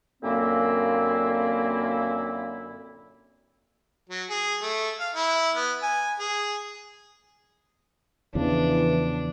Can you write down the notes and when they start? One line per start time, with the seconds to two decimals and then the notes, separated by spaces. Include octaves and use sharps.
0.22 F#2 A#2 D3 A#3 C4 E4
4.10 F#3
4.30 G#4
4.63 A3
5.00 F5
5.15 E4
5.55 B3
5.83 G#5
6.20 G#4
8.35 E2 C#3 E3 F3 D4